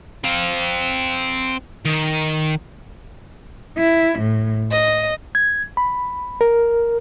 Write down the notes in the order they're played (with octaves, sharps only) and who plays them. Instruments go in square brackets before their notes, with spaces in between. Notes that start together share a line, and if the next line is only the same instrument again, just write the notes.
[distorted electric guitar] C4 F5
D#3
[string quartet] E4
A2
D#5
[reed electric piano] G#6
B5
A#4